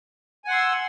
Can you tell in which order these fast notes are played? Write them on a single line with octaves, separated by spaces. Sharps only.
G#5 F#5 C6 E6